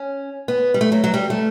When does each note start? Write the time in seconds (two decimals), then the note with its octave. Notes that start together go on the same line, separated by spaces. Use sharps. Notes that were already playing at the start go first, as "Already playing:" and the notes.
Already playing: C#4
0.48 B3
0.74 G3
0.81 A3
0.92 F#3
1.04 F#3
1.14 G3
1.30 A3